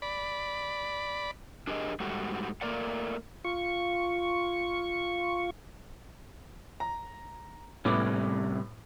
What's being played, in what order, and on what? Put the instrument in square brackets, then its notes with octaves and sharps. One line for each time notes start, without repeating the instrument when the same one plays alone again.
[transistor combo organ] D5 B5
[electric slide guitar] D4 G4 G#4 A#4 C#5 D#5
G#2 G3 A3 F#4
A3 A#3 A#4 D5 F#5
[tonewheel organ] F4 C#6
[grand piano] A#5
[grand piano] A2 B3 D6 [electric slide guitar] C3 G3 C#4